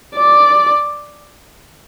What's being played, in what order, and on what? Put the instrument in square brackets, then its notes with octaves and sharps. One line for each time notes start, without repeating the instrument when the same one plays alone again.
[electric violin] D5